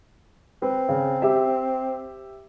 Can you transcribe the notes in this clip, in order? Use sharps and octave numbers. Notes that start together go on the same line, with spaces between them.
C4 B4
C#3
G4 E5